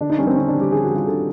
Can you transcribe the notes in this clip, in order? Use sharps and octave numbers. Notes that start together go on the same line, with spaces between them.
D3 D4
D#4
G3 C#4
C4
D3 C#4
D4
G3
G4
D3 G#4
F#4
G3
F4
D3 A4